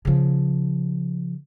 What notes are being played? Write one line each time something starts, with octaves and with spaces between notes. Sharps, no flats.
C#3 F3